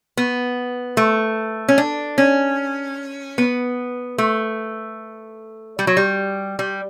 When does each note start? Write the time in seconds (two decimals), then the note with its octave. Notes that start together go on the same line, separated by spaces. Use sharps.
0.17 B3
0.97 A3
1.69 C#4
1.78 D4
2.18 C#4
3.38 B3
4.18 A3
5.79 G3
5.87 F#3
5.97 G3
6.59 G3